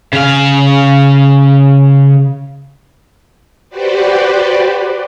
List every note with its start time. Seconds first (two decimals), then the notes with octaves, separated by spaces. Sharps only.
0.13 C#3 F5
3.70 F#4 G4 B4 C5 D5